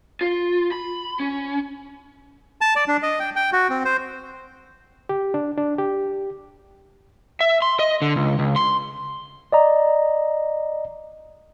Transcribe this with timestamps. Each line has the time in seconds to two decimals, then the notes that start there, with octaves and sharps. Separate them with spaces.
0.21 F4
0.71 B5
1.20 C#4
2.61 A5
2.76 D5
2.88 D4
3.03 D#5
3.20 G5
3.36 G5
3.53 F#4
3.70 C4
3.85 C5
5.09 G4
5.34 D4
5.58 D4
5.78 G4
7.41 E5
7.62 C6
7.79 D#5
8.02 D3
8.16 C#2
8.39 C#2
8.56 C6
9.52 D5 D#5 A#5